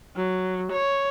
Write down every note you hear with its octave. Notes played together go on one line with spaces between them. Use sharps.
F#3
C#5